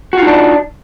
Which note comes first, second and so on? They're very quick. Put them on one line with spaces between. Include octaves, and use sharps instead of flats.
F#4 F4 D#4 D4